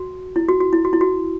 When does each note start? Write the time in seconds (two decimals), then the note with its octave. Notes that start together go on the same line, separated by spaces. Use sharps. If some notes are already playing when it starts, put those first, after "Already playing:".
Already playing: F#4
0.36 E4
0.49 F#4
0.61 F#4
0.73 E4
0.85 F#4
0.93 E4
1.01 F#4